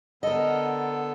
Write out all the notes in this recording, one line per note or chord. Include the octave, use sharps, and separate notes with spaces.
D3 B3 A4 A#4 D#5